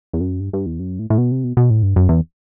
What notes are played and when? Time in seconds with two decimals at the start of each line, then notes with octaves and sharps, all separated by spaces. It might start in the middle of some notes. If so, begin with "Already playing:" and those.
0.13 E2
0.21 F#2
0.40 G2
0.53 G2
0.66 E2
0.80 F#2
0.99 A2
1.10 A2
1.18 B2
1.32 C3
1.44 B2
1.57 B2
1.70 A2
1.83 G2
1.96 F#2
2.09 E2